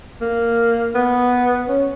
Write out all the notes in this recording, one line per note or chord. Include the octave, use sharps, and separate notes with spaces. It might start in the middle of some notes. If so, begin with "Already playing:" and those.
A#3
B3
C#4